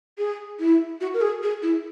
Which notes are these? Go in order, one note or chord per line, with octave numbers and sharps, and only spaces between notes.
G#4
E4
F#4
A#4
G#4
G#4
E4